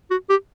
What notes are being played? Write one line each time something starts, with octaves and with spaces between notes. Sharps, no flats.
F#4
G4